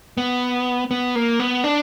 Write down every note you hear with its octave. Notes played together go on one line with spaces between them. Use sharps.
B3
B3
A#3
B3
D4